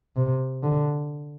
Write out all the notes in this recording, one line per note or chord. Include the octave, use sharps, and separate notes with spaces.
C3
D3